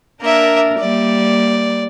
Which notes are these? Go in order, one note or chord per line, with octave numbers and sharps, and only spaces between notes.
A#3 D4 A#4 D5 E5
G3 A#3 D5